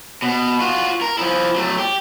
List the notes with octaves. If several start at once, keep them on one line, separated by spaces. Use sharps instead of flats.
B2
F4 F#4
A#4
F3 E4
F#3 A3
G4